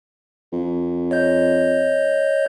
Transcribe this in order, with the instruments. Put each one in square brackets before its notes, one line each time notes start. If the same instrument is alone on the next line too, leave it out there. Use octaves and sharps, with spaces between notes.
[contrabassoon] F2
[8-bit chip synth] C#5 D#5 G6